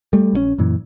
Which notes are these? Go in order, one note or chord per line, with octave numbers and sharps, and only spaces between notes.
G3 A3
A#1 D3 C#4
F#2 A#2 E3